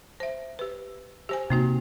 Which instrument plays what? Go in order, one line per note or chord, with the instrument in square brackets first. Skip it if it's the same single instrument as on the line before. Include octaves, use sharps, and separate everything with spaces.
[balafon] C5 E5
G4 B4
G4 C5 G#5
[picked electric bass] C3 [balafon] A#3 D#4 F#4